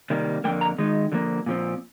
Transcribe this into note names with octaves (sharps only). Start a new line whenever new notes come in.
C3 D#3 G3 A#3
F2 D3 G3 A#3 G5
A#5
D#3 G#3 D#4
D3 F3 A#3
A#2 F3 C4